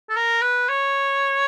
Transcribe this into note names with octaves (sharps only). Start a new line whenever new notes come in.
A4
A#4
B4
C#5